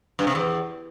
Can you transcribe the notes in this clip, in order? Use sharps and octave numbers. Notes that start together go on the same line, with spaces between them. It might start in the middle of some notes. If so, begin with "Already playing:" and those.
G2
C3
E2